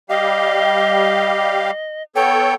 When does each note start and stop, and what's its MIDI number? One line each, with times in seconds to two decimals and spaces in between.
0.10 1.71 55
0.10 1.71 67
0.10 2.03 75
0.10 1.71 77
2.16 2.54 59
2.16 2.54 69
2.16 2.54 73
2.16 2.55 79